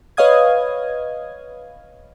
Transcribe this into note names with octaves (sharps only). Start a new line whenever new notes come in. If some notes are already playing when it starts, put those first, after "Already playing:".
B4 C#5 D#5 F5 D#6 G#6